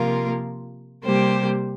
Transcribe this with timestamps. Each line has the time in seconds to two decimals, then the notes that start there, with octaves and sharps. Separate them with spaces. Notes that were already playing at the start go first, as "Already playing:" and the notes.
Already playing: C3 F3 A#3 F4 A#4
1.04 C3 G3 A#3 G4 C5